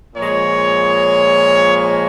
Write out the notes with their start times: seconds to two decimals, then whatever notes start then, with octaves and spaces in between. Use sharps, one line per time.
0.15 A#2 F3 G#3 C#5
1.76 C#5